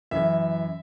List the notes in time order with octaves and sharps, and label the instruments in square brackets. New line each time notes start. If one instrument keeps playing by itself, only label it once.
[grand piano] F#2 E3 E5